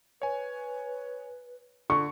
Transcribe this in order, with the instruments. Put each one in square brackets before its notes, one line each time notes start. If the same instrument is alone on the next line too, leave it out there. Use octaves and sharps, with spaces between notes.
[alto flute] B4 [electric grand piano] C#5 G#5
[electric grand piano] D3 [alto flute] F4 [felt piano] C#6